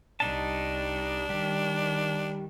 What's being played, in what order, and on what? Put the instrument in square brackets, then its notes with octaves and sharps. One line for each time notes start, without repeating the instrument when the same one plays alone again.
[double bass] C2 [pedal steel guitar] G3 D#4 A5 [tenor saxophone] D4
[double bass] D#3 [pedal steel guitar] G3